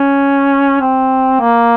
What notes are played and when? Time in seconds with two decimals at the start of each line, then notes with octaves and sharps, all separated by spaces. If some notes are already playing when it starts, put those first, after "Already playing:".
Already playing: C#4
0.81 C4
1.41 A#3